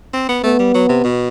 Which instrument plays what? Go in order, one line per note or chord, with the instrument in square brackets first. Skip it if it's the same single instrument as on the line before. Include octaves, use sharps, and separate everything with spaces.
[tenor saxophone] C4
B3
[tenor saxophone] A3 [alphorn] B3
[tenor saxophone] G3
F#3
C3
B2